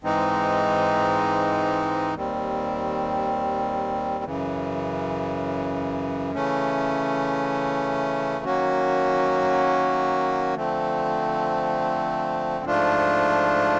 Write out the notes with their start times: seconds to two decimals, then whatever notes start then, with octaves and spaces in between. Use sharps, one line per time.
0.04 G#2 E3 G#3 C4 D#4
2.14 D#2 D#3 G3 C4
4.24 F#2 C#3 E3
6.34 C#3 E3 A3 C#4
8.45 D#3 F#3 A#3 C#4 F#4
10.55 D3 F3 A3 C4
12.65 G#2 F3 A3 D4 F4